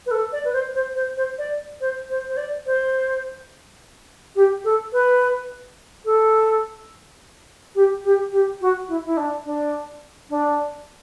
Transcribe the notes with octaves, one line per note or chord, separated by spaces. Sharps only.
B4
A4
D5
B4
C5
C5
C5
C5
D5
C5
C5
C5
D5
C5
G4
A4
B4
A4
G4
G4
G4
F#4
E4
E4
D4
D4
D4